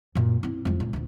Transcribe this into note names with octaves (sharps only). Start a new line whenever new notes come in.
F#2 A#2
C4 E4
F2 G#3
C#2 A#2
D2 A#2